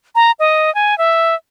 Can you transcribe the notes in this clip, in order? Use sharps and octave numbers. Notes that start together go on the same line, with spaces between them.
A#5
D#5
G#5
E5